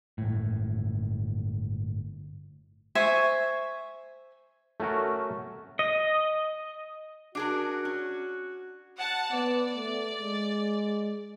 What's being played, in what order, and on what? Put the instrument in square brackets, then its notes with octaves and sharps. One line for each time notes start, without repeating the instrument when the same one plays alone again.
[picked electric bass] G1 A2
[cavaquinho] C5 E5 G#5 C#6
[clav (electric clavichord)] A3 C#4 F#4 A#4
[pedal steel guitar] D#5
[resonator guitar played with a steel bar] D4 G#4 A#4 [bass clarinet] F#4
[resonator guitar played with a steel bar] C#4
[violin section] F#5 A5
[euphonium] B3 [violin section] D5
[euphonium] A3
G#3